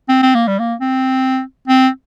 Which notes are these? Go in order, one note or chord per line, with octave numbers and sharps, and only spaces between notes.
C4
C4
A#3
G3
A#3
C4
C4